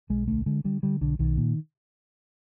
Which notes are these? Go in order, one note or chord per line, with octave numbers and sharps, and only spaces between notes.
B1 G#3
D2 A3
D3 G#3
D3 G3
D3 G3
B1 D3
B1 D#3
A#2